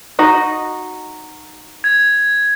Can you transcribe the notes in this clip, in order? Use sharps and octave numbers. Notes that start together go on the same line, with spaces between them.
D#4 F#4 D#5
G#6